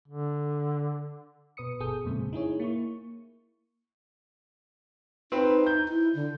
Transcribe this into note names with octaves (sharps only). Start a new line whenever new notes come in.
D3
B2 B4 D#6 C#7
G1 B2 G#4 A4 D#6 G6
F2 A#2 C#3 G#3 C4
D#4 E4 G#4 C#5
A#3 E4 C#6
C4 D#4 B4
G6
E4
D3